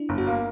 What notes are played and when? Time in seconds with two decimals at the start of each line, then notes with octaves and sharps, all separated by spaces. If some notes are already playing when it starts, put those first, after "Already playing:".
Already playing: D4 E4
0.09 G1
0.18 F#4
0.27 A#3